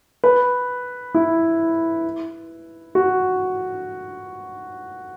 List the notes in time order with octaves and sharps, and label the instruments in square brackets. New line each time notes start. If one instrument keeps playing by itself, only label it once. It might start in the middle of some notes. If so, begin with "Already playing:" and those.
[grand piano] B4
E4
F#4